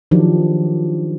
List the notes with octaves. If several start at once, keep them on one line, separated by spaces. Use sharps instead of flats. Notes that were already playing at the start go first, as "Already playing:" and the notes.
D#3 F3 F#3 D4 G4